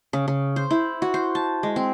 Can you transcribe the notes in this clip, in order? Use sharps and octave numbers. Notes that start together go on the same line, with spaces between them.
C#3
C#3
C5
E4
F#4
C5
A5
G#3
C4